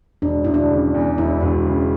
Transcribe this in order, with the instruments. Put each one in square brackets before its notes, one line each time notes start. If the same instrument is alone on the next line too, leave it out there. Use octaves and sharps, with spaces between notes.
[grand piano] E1 [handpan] D4
[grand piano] E1 [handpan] E4
[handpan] D4
[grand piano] C#3
E2
[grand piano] E1 [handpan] E4
[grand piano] E1
C#3